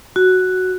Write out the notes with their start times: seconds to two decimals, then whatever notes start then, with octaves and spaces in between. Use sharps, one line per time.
0.16 F#4